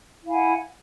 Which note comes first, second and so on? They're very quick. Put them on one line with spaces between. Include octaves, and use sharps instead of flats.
E4 F5 G#5 F#5